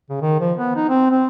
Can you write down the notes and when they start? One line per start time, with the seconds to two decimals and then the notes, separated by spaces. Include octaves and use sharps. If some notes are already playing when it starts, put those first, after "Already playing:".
0.09 C#3
0.21 D#3
0.40 F3
0.57 B3
0.76 D#4
0.89 C4
1.11 C4